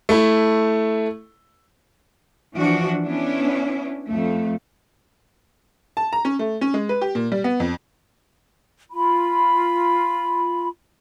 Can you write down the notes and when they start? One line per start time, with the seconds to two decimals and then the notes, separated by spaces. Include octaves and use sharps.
0.09 A3 E4
2.54 E3 F3 D4 F#4
3.06 B3 C#4 D4 E4
4.10 F2 A3
5.97 A5
6.13 A#5
6.25 C#4
6.39 A3
6.61 C#4
6.74 G#3
6.89 B4
7.01 G4
7.15 A#2
7.32 G3
7.44 B3
7.60 F2
8.91 F4 B5